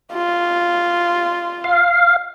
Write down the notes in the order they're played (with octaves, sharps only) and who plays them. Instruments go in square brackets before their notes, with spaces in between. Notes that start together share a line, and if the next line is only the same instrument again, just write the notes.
[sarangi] F4
[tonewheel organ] F5